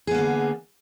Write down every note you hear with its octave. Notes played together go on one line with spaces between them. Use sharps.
D3 A#3 B3 G#4